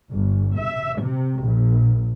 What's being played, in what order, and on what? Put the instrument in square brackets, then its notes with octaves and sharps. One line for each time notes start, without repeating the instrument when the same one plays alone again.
[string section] G1
E5
C3
A#1